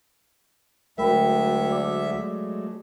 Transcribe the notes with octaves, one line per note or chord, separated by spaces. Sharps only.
D2 F#3 G#3 A3 A#4 E5 G5 B5
D5 D6